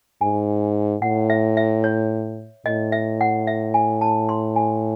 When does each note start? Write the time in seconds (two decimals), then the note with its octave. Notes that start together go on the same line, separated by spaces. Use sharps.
0.21 G#2 G#5
1.02 A2 F#5
1.30 E5
1.57 E5
1.84 C#5
2.66 A2 D#5
2.92 E5
3.21 F#5
3.47 E5
3.74 G#5
4.01 A5
4.29 C6
4.56 G#5